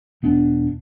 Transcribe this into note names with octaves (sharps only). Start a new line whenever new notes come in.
E1 B3 D4